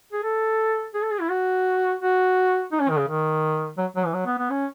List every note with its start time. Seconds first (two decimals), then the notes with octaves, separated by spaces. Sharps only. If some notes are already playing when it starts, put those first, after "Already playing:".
0.13 G#4
0.23 A4
0.95 G#4
1.02 A4
1.12 G#4
1.21 E4
1.30 F#4
2.00 F#4
2.72 D#4
2.80 C#4
2.89 D#3
2.98 C#3
3.08 D#3
3.78 F#3
3.96 F#3
4.06 E3
4.14 F#3
4.26 B3
4.38 B3
4.50 C#4